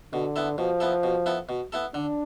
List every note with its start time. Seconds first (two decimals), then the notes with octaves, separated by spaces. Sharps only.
0.13 B2 D3
0.36 B3 E4 A4
0.58 B2 F3
0.80 B3 E4 A4
1.03 B2
1.26 B3 E4 A4
1.49 B2
1.72 B3 E4 A4
1.94 D3 D4